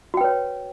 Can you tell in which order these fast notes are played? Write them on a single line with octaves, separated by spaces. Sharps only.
F#4 G5 B4 C#5